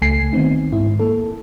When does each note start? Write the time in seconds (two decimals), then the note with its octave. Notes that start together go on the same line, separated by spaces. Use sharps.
0.02 C#2 A3 G#5 C7
0.33 D#3 B3 C4 D#4
0.73 G#2 E4
1.00 A#3 A4